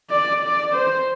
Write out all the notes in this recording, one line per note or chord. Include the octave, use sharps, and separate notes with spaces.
D5
D5
C5